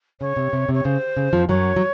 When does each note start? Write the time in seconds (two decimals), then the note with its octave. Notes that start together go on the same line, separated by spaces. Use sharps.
0.20 C#3 C#5
0.37 C3
0.53 C3
0.69 C3 C#5
0.84 C#3 C5
1.17 C#3
1.33 F2 F3
1.49 F#2 F#3 C#5
1.76 F#3